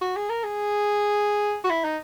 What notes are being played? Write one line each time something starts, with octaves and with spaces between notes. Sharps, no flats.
F#4
G#4
A#4
G#4
F#4
E4
D#4